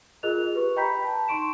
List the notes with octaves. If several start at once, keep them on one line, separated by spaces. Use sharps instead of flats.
F4 G#4 A#4 D#5 F#6 F7
G4 B4 C#6
D#5 G5 A#5 B5 G6 B6
A5
D#4 C6 C#6 D7 E7